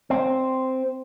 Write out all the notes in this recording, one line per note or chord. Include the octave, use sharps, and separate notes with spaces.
C4